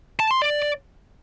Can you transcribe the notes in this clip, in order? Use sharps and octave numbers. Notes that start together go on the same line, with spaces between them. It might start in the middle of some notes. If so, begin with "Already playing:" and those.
A5
C6
D5